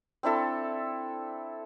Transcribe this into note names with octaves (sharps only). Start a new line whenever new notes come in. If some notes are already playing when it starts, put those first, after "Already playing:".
C4 D4 E4 A4